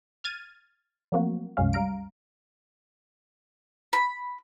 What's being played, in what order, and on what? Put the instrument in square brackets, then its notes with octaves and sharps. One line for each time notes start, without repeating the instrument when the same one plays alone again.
[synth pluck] F6 G#6 A6 D#7
F3 F#3 A3 A#3 C4 F#4
C2 F#2 G#3 C#4 F5
G3 F5 A#5 D7
[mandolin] B5